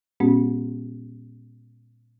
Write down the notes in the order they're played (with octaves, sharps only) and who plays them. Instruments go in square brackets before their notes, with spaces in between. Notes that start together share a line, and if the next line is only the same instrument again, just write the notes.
[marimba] A#2 G#3 B3 C#4 F#4